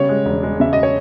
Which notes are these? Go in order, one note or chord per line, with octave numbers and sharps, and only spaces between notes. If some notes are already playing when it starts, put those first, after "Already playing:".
Already playing: C#3 G3 C#5
G#3
E1
G#3
C#3 E5
D#5
C#5